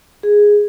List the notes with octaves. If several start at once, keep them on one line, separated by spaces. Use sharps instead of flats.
G#4